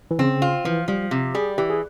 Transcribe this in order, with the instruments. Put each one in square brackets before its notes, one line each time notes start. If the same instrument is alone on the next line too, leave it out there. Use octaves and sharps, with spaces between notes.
[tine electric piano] E3
[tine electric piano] C#3 [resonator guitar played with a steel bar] C4
[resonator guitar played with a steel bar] F4
[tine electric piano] E3 [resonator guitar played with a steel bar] F3
[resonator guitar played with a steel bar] F3 [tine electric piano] G3
[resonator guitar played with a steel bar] C3
[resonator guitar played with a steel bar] G3 [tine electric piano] G#4
[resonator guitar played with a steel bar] E3 [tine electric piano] G4
[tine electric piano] G#4